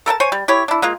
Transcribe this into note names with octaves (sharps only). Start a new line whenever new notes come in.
A4 A#4 G5 A5
C5 C#5 G#5
G3
E4 G4 C#5
D4 E4
G#3 A#3 F4